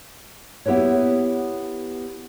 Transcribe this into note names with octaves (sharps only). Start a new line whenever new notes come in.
B3 E4 G4 B4 C#5